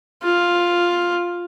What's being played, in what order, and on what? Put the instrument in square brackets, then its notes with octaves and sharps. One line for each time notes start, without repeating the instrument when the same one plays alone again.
[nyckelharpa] F4